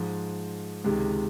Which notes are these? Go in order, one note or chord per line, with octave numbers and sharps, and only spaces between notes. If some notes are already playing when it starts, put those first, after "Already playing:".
Already playing: G#2 F3 G#3
C#2 C3 D#3 G#3